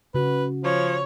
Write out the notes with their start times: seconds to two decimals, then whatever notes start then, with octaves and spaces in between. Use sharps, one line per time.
0.14 C#3 F#4 B4
0.64 F3 C#5